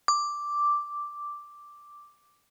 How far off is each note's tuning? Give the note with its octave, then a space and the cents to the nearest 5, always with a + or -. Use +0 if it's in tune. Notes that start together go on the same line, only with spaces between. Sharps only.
D6 +0